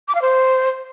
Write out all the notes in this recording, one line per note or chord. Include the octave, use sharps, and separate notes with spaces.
D6
F5
C5